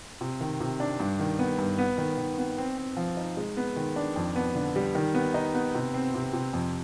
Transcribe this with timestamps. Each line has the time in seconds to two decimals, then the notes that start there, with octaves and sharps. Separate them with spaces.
0.21 C3
0.41 D#3
0.60 C3
0.80 D4
1.00 G2
1.19 D#3
1.39 B3
1.59 G2
1.78 B3
1.98 D#3
2.17 D#3
2.38 B3
2.58 C4
2.78 C4
2.97 F3
3.17 D#4
3.37 G#3
3.57 B3
3.76 D#3
3.96 D4
4.16 F2
4.36 B3
4.55 D3
4.76 G3
4.95 D#3
5.14 B3
5.34 D#4
5.54 B3
5.75 C3
5.94 C4
6.14 C3
6.33 C3
6.53 F2